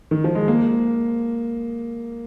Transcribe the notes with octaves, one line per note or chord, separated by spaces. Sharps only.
D#3
F3
G#3
A#3